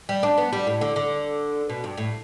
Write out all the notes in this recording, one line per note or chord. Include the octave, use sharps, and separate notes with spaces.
G3
D4
B3
G3
A2
D3
D3
B2
G2
A2